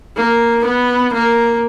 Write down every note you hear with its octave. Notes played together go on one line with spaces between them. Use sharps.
A#3
B3
A#3